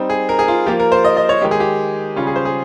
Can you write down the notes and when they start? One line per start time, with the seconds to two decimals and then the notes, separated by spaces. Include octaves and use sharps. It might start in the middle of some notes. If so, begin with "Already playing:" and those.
Already playing: G3 C4 D#4
0.10 G#4
0.29 A#4
0.39 G#4
0.48 F4
0.66 F3 A#3 F4 G4
0.80 A#4
0.92 C5
1.05 D#5
1.17 D#5
1.29 C#5
1.41 D#3 G#3 D#4 G4
1.51 G#4
1.60 G4
2.16 C#3 G3 C#4 F4
2.27 G#4
2.36 C5
2.45 G#4